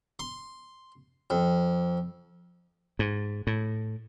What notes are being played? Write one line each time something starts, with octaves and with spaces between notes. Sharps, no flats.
C6
F2
G#2
A2